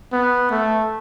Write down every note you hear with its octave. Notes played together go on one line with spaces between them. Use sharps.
B3
A3